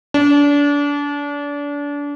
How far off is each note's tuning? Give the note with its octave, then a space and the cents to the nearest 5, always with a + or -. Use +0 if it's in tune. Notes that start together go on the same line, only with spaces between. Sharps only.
D4 -30